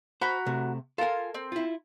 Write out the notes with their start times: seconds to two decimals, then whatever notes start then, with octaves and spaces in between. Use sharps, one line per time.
0.21 F#4 C5 A#5 B5
0.46 C3 A3
0.98 F4 A4 A#4 G#5
1.34 C4
1.52 E4 F4